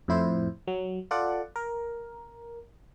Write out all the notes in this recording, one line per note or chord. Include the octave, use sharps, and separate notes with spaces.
F2 A2 E4 C5
F#3
F4 A4 D5 F#5
A#4